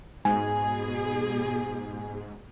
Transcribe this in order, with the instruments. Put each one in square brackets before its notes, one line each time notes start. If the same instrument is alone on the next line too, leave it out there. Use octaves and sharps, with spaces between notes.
[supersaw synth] G#2 [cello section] B2 G#4 [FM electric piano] G#5